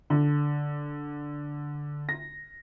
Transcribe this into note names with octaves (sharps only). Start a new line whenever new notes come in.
D3
A#6